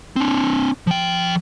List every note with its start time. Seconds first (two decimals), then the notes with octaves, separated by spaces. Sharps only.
0.16 C4 D4
0.87 F3 G5